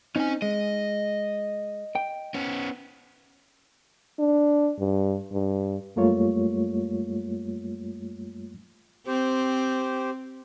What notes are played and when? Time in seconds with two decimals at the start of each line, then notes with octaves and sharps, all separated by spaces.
0.16 C4 C#4 D#4 G#5
0.42 G#3 D#5
1.95 G5
2.34 B3 C#4
4.19 D4
4.79 G2
5.33 G2
5.96 F#2 G3 A3 A#3 F4 C#5
9.07 C4 G4 C5